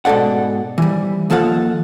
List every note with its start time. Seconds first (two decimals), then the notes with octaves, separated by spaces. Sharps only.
0.05 G#2 B2 A4 D5 F#5
0.78 E3 G3
1.30 D#2 F3 A4 F5 F#5